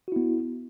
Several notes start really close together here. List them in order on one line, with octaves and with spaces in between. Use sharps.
F#4 E4 B3